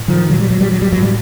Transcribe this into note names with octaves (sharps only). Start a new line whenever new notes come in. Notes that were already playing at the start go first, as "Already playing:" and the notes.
Already playing: A2
D#3 F3
A#2 F#3
G3
F#3
G3
F#3
G3
A2 F#3
G3